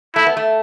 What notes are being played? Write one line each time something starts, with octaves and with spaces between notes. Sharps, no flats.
A3 E4
B3
A3